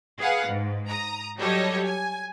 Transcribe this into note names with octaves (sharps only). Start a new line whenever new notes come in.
G#4 B4 F5 F#5
G#2
A#5 D#6
F#3 G3 G4 A4 C#5 D#5
G#5